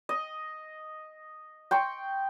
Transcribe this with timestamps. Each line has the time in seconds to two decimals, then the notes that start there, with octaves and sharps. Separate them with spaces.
0.09 D#5
1.71 G5 C6 C#6